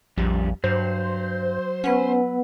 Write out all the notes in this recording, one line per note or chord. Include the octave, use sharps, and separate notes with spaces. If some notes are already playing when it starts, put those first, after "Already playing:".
A#1 F2 G3
G2 F#3 C5
B3 C#4 B4 F#5